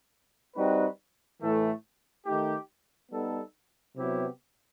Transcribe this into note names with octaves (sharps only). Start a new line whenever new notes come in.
G3 C4 D#4 F#4 B4
A2 E3 A3
D#3 A3 D#4 G4
G3 B3 D#4 A4
C3 F#3 B3 E4 G4